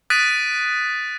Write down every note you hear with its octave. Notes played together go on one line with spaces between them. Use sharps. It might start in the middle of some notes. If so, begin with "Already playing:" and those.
D#6 F#6 A6 B6 D7 D#7